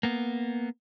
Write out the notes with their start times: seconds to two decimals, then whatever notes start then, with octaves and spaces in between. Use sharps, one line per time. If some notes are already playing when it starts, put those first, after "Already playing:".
0.03 A#3 B3